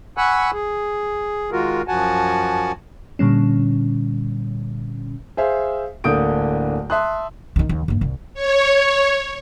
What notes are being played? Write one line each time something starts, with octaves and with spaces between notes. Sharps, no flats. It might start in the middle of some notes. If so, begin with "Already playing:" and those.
F#5 G#5 B5 C#6 E6 F#6
G#4
D#3 G#3 F4 F#4 A#4
F#2 F3 F#4 F#5 G#5 A5
A#2 D3 G3 C#4
G#4 C5 E5 F5
D1 D3 A#3 D#6 G6 D7
E5 A5 C6 D#6 F#6
G2 D#3
D#2
G2 A#3
C2
C#5